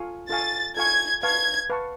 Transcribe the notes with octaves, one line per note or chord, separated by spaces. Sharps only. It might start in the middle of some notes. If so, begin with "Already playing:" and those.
Already playing: F4 A4 F5 G#5 C#6
F4 A4 F5 G#5 C#6 A6
F4 A4 F5 G#5 C#6 G#6
B4 F5 A5 C#6 G#6
B4 F5 A5 C#6